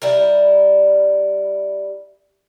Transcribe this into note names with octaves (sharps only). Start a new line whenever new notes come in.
G3 E4 A#4